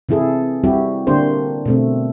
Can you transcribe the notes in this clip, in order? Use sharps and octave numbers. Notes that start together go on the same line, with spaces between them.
C3 E3 E4 G#4 A4
G3 C4 E4 F#4 G4
D3 A#3 D4 G4 C5
B2 A3 C4